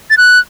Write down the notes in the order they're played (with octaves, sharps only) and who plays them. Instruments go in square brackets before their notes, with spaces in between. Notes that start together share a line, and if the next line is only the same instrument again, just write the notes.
[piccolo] A6
F#6